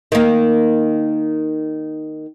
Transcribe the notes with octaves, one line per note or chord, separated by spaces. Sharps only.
D#3 A#3